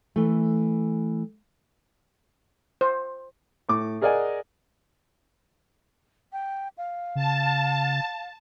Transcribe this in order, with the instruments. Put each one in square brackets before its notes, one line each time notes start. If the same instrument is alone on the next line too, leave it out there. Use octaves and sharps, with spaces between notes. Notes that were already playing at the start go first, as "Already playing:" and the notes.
[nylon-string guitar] E3 A3
[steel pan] C5
[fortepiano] A2 D6
G#4 A#4 D5 D#5 F#5 G#5
[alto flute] G5
F5
[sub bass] C#3 [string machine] A5